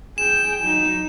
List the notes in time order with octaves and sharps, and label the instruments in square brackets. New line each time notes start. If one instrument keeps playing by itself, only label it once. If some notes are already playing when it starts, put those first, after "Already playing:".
[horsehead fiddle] G#4 G5 [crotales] E7
[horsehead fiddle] F#3 D#4